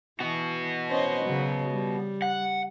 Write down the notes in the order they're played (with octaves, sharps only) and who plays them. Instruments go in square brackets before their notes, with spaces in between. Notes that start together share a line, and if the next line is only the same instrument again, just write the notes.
[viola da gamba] E3 [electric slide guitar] B3 F#4
[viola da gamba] C#4 C5 D#5
C#3 F#3
G3
[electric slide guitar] F#5